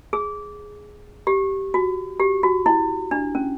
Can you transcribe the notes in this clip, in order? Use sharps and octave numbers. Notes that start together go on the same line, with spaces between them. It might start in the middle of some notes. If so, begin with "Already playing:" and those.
G#4
G4
F#4
G4
F#4
E4
D4
C#4